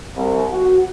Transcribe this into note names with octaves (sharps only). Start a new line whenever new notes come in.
C2
F#4